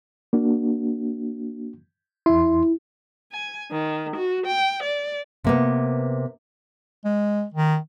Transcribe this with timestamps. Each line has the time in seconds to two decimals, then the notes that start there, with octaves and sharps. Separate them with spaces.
0.33 A#3 D4 F#4
2.26 E2 E4 C6
3.32 G#5
3.71 D#3
4.16 F#4
4.47 G5
4.83 D5
5.44 C3 A#3 B3
7.05 G#3
7.54 D#3